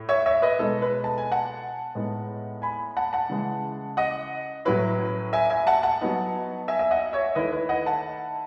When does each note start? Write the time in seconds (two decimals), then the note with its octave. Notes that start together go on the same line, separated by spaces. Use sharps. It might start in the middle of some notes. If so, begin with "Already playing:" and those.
Already playing: A2
0.09 C#5 E5
0.26 C#5 E5
0.42 B4 D#5
0.59 B2 G#3 D#4 A4
0.82 B4
1.04 A5
1.18 G#5
1.32 F#5 A5
1.95 A2 G#3 B3 D#4
2.62 G#5 B5
2.97 F#5 A5
3.13 F#5 A5
3.30 C#3 E3 G#3
3.97 D#5 F#5
4.65 A2 F#3 C#4 E4 B4
5.33 E5 G#5
5.50 E5 G#5
5.67 F#5 A5
5.83 F#5 A5
6.01 F#3 B3 D#4
6.68 E5 G#5
6.79 E5
6.91 D#5 F#5
7.13 C#5 E5
7.35 D#3 A3 E4 B4 D#5
7.52 B4
7.69 D#5 F#5
7.86 F#5 A5